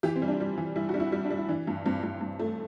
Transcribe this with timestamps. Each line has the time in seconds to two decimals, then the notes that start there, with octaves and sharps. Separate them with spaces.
0.03 E3 G4
0.16 C4
0.22 G3
0.28 D4
0.40 G3
0.57 E3
0.76 G3 E4
0.89 F#4
0.94 G3 D4
1.00 E4
1.12 G3
1.24 D4
1.30 G3
1.37 E4
1.49 E3 D4
1.67 G2
1.85 G2 C4
2.03 G2
2.21 G2
2.39 A3